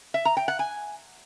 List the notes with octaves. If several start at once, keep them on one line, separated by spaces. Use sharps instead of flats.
E5
A#5
G5
F#5
G#5